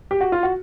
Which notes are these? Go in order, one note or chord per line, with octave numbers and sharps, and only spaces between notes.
G4
F#4
F4
F#4